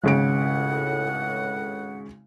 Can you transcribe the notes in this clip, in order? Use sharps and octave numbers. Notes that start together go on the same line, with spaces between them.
G#1 C#2 A2 C#3 F#5 D7